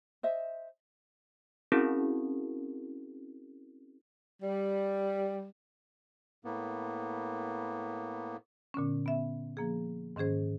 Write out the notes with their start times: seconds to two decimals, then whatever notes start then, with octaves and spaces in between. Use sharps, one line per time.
0.23 C5 D#5 E5
1.72 C4 C#4 E4 F#4 G#4 A#4
4.43 G3
6.44 A2 A#3 B3
8.74 A#2 D3 B3 C#4
9.06 B3 E5
9.57 F3 A#3 G#4
10.16 G#2 D#3 C#4 G#4 C5